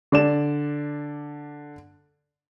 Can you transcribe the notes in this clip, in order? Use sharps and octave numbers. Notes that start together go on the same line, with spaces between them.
D3 D5 E7